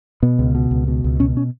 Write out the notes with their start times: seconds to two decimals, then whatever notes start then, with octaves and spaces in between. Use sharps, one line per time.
0.23 B2 B3
0.39 C#2
0.55 B2
0.71 C#2
0.88 B2
1.04 C#2
1.20 B2 C#4
1.37 C#4